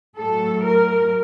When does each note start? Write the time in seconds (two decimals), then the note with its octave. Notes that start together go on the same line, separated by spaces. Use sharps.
0.18 A2 F#3 A4
0.63 A#4